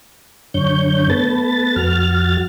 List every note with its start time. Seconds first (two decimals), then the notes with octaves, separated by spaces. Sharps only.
0.54 F#2 D3 C#5 G6
1.10 A3 B3 B4 A5 A6
1.76 F2 F#4 F6 A6